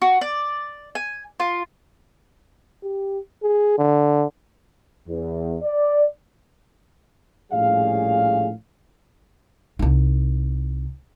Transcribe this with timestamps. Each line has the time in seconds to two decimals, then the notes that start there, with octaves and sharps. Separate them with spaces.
0.02 F#4
0.21 D5
0.95 G#5
1.40 F4
2.83 G4
3.43 G#4
3.78 D3
5.09 E2
5.63 D5
7.52 A#1 A2 G3 C#4 G#4 F5
9.79 C2 D#4